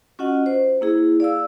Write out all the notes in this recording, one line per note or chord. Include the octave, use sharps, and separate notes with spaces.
C#4 F4 F#4 D#5 F#5
C5
A#3 E4 G#4
D5 F5 E6